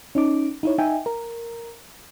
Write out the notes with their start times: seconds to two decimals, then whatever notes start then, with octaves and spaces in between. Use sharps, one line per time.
0.15 C#4 D#4 D6
0.63 D#4 E4 C#5
0.78 D#4 E5 G5 G#5
1.06 A#4